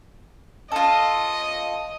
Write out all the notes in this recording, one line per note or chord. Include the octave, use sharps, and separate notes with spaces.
F4 A4 D#5